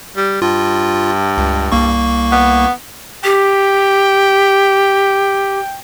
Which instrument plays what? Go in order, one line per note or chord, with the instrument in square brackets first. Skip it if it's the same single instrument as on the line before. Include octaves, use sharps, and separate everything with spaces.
[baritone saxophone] G3
[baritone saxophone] G2 [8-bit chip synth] F4
[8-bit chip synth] C#2
C2 A#3 C#6
[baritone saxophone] B3
[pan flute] G4 [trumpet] G5